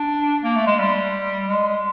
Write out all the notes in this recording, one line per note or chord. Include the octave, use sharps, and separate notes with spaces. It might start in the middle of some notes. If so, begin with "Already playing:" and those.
Already playing: D4
A#3
A3
G#3
G3
G#3